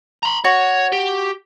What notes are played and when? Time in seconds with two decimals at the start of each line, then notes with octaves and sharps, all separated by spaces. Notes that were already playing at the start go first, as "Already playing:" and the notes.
0.23 A#5 B5
0.44 F#4 C#5
0.92 G4